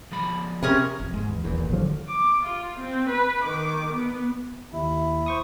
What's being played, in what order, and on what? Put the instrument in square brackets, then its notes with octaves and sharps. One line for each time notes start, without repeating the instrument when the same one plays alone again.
[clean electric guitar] F3 G#3 B5
[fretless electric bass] C3 [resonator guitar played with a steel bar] C#4 G#4 A#4
[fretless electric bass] F#1 F2
G#2 G#3
[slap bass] E2
[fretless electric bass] D#1 [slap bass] E2 A#2
[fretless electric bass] G#1
[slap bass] D3 F3 F#3
[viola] D6
F4
C4
B4
D#3 D6
B3
[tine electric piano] D#2 [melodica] E4
[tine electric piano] C5 C#6 D#6